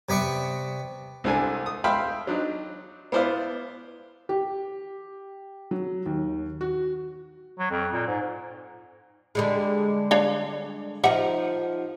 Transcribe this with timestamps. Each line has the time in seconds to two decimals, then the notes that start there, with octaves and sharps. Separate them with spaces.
0.09 C3 B3 D5 C#6
1.24 C2 C4 D4 A4 G#5
1.66 D#6
1.84 E5 F5 G5 B5 C6
2.27 F#3 D4 D#4
3.12 B3 E4 C5 D5 F5
4.29 G4
5.71 F#3
6.06 D#2
6.61 F#4
7.59 F#3
7.71 F2
7.93 A#2
8.07 G#2
9.35 D3 G3 G#3
10.11 D4 C#5 F5
11.04 F3 D#4 G4 E5 F#5